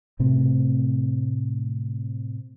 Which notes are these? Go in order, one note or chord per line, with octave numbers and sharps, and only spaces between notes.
A2 C3 A3 C4